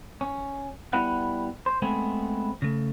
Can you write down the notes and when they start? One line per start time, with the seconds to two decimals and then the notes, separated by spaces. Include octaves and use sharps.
0.21 C#4
0.93 G3 B3 E4 B4 F#5
1.66 C5
1.82 G#3 A3 B3 C4 G#4
2.62 C#3 A3